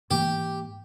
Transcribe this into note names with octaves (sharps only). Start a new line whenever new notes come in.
G#2 E3 A#3 G4